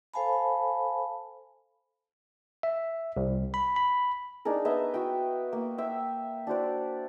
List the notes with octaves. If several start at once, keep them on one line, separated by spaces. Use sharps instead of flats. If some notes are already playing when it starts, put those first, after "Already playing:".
A4 C5 F5 G#5 A5 B5
E5
C2
B5
B5
D4 D#4 G#4 A#4
B3 D#5 E5 A#5
F#4 G5
A#3
E5 G5
D4 F#4 C5 D5